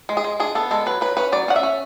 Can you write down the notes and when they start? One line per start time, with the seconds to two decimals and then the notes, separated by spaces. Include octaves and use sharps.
0.09 G#3
0.17 G#4
0.24 G#3
0.40 D4 G#4
0.55 B3 A4
0.71 G#3 A4
0.86 F#3 B4
1.01 F#3 B4
1.17 C#4 B4
1.32 F#3 D5
1.48 C#4 F#5
1.56 E5
1.63 C#4